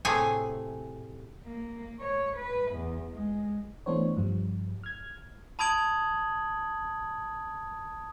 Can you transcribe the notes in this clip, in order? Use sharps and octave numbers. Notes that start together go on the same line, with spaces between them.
A2 C3 A3 G#4 G#5
A#3
C#5
B4
E2
G#3
E3 A3 B3 D4 C5 C#5
G2 F3 G3
F6 G#6
A5 B5 D#6 G#6 D7 F#7